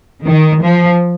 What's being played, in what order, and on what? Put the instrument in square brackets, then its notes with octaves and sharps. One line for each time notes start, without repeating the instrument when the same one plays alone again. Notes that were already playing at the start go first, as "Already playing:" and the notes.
[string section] D#3
F3